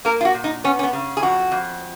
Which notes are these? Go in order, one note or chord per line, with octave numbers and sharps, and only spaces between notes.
A#3 A#4
F4
F#4
A#2
D#4
B3 C#4
C#4
B3
C#3
G#4
F2 F#4
F2